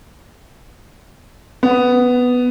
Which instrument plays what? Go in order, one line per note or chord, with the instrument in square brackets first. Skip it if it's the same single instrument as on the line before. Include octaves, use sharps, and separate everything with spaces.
[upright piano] B3